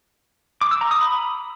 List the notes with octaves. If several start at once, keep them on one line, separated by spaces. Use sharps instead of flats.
D6
E6
A#5
D#6
B5